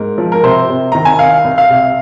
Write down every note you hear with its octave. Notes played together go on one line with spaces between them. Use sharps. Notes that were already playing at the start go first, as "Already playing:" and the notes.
Already playing: G#2 A#4
F3
A#4
C3 C5
C3
D#3 A#5
G#5
C2 F5
C2
F5
C3